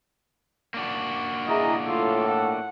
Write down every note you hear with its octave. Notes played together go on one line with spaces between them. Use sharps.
A#3 D4 F#4
E4 G#4 D#5 A#5
A2 F4 A4
F#5